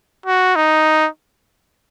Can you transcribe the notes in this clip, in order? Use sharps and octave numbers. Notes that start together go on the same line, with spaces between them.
F#4
D#4